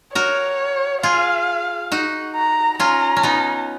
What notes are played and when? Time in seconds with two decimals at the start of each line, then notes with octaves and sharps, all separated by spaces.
0.15 F#4 A#4 C#5
1.03 F4 G#4 F5
1.92 D#4 F#4
2.36 A#5
2.79 C#4 F4 A#5
3.17 C#4
3.23 B3 D#4